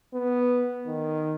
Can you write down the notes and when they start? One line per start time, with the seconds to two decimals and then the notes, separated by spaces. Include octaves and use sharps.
0.14 B3
0.87 D#3